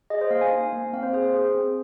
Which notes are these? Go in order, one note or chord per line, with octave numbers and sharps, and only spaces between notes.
G#4 D#5
C5
A#3 F5
G#5
D#4
A#3
C4 F5
C5
G#4 C5
C5
G#4
C4